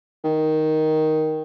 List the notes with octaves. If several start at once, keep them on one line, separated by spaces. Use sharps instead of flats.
D#3